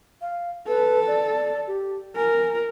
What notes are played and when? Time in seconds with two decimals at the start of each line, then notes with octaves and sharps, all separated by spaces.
0.22 F5
0.68 A4 B4
1.07 D5
1.67 G4
2.16 A#4 G#5